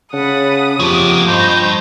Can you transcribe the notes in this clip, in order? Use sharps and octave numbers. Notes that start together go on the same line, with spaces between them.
C#3 F#5 A5 B5 D#6
F2 C3 F3 A#3 F#4 D6
G2 C5 D#5 C#6 G6